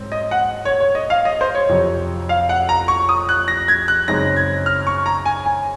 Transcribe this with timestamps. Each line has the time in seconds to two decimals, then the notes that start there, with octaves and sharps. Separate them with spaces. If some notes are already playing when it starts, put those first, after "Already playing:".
Already playing: G#2 F#3 C4
0.12 D#5
0.31 F#5
0.65 C#5
0.80 C#5
0.95 D#5
1.10 F5
1.25 D#5
1.41 C5
1.55 C#5
1.69 F2 C3 F#3
2.29 F5
2.49 F#5
2.69 A#5
2.88 C#6
3.09 D#6
3.29 F#6
3.48 A#6
3.68 G#6
3.88 F#6
4.08 F#2 C#3 G#3 C4 D#4 A#6
4.36 G#6
4.66 F6
4.87 C#6
5.06 A#5
5.25 G#5
5.46 G#5